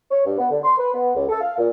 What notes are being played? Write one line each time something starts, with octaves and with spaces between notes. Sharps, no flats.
C#5
G2
B3
D3
C6
B4
B3
C#2
A4
F5
A#2